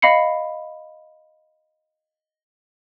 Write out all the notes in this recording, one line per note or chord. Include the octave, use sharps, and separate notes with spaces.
D#5 F5 B5 C7 C#7